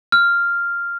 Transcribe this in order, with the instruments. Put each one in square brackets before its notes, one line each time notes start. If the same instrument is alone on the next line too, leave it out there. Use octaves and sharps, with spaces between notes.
[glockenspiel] F6